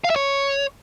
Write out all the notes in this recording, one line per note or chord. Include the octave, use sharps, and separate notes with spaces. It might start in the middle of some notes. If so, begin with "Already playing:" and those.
F5
E5
C#5